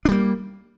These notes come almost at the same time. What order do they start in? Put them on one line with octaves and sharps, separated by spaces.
D4 G3 A#3